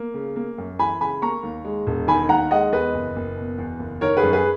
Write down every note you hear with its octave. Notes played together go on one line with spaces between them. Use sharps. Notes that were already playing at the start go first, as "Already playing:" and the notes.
Already playing: A#3
C#3
A#3
F#2
E3 G#5 B5
C#3 G#5 B5
A#3 A#5 C#6
D#2
G#3
E1
D#3 G#5 B5
D#2 F#5 A#5
G#3 D#5 F#5
E2 B4 D#5
F#1
F#1
B2
E2
F#1
D#3 A#4 C#5
G#4 B4
F#2
G#4 B4